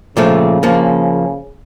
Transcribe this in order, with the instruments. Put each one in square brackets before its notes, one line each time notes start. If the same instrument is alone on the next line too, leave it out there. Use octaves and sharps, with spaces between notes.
[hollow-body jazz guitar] A#2 F3 A3 [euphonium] C#3
[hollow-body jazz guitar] F3 A#3